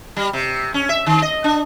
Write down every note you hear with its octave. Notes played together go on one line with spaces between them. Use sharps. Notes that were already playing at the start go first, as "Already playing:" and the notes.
G3
C3
C#4
E5
D#3
D#5
D4